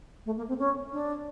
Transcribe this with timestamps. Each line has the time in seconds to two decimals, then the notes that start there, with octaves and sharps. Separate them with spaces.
0.26 A3
0.37 A#3
0.48 C4
0.59 C#4
0.92 D4